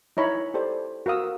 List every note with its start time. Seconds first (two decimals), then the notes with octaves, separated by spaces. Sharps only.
0.17 D#4 E4 C#5 A#5 B5
0.54 G4 A4 C5 D5
1.06 F#4 A#4 F5 D#6 E6